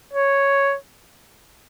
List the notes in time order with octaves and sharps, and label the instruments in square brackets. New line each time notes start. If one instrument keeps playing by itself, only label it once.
[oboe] C#5